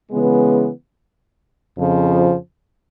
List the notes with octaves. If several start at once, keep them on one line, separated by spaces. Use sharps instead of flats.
C#3 E3 G#3 B3
F2 C#3 F3